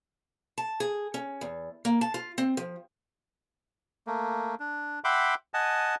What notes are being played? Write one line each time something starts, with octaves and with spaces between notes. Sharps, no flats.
A5
G#4
C#4
E2
A#3
A5
F4
C4
F3
A3 A#3
D4
E5 F#5 G5 B5 C6 D6
D#5 F#5 G#5 A5